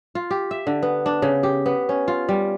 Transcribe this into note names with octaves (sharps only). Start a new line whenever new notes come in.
F4
G4
E5
D3
B3
D4
C#3
G4
B3
C#4
F4
G3